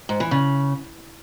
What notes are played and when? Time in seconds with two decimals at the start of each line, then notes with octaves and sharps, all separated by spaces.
0.09 G#2
0.20 E3
0.31 C#3